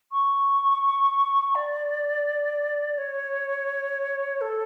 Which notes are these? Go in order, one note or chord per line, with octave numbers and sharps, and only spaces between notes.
C#6
D5
C#5
A4